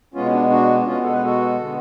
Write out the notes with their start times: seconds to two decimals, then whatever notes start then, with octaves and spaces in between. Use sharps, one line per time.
0.14 B2 G#3 B3 C#4 F4
0.26 C#4
0.32 D4
0.50 D4 F#4
0.86 B2 G#3 B3 C#4 F4
1.03 A4
1.13 B4
1.24 F#4 A4
1.59 D3 G#3 B3